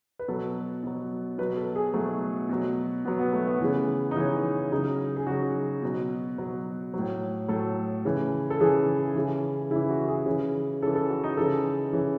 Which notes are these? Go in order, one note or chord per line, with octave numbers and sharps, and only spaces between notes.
B4
B2 F#3 A4
B2 F#3
B2 F#3 B4
A4
G#4
B2 F#3 A3
B2 F#3
B2 F#3 B3
B3
A3
B3
C#3 E3
D#4
C#3 E3 C#4
C#3 F#3 D#4
G#4
C#3 F#3 F#4
B2 F#3
B2 F#3
A2 F#3
A2 F#3 A4
C#3 E3
A4
C#3 E3 G#4
C#3 E3
C#3 E3 E4
F#4
G#4
C#3 E3
C#3 E3 A4
A4
F#4
D#4
C#3 E3 A4
C#3 E3